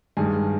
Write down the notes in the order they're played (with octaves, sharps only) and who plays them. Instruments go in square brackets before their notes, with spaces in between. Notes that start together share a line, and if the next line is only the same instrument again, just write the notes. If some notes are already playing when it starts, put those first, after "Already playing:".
[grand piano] G2 D#3 G#3 G#5